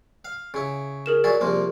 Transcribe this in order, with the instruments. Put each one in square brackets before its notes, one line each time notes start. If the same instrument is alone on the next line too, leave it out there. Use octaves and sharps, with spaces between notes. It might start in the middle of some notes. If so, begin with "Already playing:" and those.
[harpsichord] F5
C#3 E4
[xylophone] G#4 A#4 E7
[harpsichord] F#3 E4 G#4 [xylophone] D5
[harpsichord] C2 F3 A#3